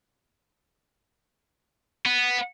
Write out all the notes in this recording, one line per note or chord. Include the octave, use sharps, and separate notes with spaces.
B3